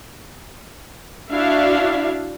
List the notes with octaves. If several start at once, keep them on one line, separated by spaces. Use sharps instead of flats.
D4 E4 F#4 E5 F5